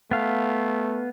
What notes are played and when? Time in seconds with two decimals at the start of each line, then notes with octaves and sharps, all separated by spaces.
0.11 A3 B3 F5